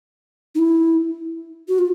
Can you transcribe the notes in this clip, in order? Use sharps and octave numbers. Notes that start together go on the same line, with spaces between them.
D#4
E4
F#4
F4